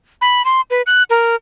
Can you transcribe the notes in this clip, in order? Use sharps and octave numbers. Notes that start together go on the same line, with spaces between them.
B5
C6
B4
F#6
A#4